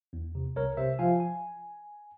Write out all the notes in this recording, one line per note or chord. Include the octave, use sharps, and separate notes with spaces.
E2
C3
C2 A#4 C#5
C3 C5 E5
F3 F5 G#5
G#5